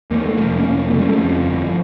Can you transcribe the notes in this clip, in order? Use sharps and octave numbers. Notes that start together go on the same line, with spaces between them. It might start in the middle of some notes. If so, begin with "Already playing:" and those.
E2 A#3
A3
F1 A#3
C#4
F1 A#3
C#3 A3
G3
A3
F2 F3
G1